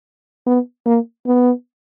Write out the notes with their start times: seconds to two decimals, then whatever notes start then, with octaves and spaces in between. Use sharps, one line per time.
0.46 B3
0.86 A#3
1.27 B3